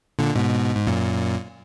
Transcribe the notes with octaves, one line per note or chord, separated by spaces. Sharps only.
A#2 D3
G#2 B2
G#2
F#2 A#2